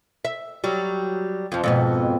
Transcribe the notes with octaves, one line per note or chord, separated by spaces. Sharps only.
E5
F#3 G3
F2 F3
F2 G#2 B2